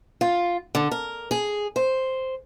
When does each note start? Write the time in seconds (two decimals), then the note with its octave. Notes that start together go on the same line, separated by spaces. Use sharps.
0.21 F4
0.75 D3
0.91 A#4
1.31 G#4
1.76 C5